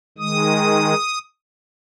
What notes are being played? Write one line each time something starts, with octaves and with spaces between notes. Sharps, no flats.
D#3 G#3 D#6